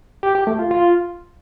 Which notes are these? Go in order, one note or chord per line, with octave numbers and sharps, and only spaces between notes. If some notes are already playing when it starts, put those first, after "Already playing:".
G4
G4
A3
F4
F4